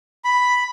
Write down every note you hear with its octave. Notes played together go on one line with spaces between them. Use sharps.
B5